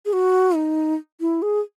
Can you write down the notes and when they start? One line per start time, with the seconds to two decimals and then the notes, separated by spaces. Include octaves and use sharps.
0.05 G#4
0.13 F#4
0.55 D#4
1.20 E4
1.42 G#4